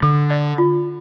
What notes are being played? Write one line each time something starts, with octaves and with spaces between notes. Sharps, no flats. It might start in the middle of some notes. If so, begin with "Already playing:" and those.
D3 A4
D5
F4